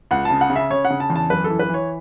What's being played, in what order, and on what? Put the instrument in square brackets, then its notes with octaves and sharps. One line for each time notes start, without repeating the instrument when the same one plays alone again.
[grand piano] C#2 F#5
C#3 A5
F#5
C#3
E5
C#3 C#5
F#5
C#3
A5
E2
A5
F#2 B4
A4
E3
B4
E3 C#5